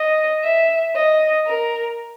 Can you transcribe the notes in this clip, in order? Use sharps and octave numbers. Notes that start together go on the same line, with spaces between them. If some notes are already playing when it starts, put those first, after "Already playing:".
Already playing: D#5
E5
D#5
A#4